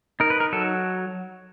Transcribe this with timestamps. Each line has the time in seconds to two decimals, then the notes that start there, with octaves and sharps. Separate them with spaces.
0.20 D#4 A#4
0.30 B4
0.40 A#4
0.53 F#3 A4